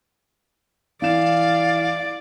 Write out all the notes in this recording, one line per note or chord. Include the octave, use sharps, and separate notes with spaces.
E3 D5 F5 E7